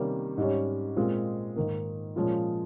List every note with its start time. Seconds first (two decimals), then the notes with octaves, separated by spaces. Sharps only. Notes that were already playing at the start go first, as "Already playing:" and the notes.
Already playing: C3 D#3 G3 A#3 C#4
0.38 G#2 G3 C#4
0.96 A#2 G#3 C4 F4
1.56 G#2 D#3 A#3
2.16 A#2 F3 G#3 C#4 F4